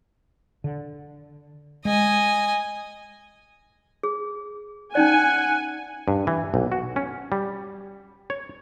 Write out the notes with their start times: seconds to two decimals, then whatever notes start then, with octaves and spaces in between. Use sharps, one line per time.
0.64 D3
1.85 G#3 D#5 G#5
4.03 G#4
4.95 C#4 D#4 D5 F#5 G#5
6.08 G2
6.27 E3
6.54 B1
6.72 F#4
6.96 C#4
7.32 G3
8.30 C#5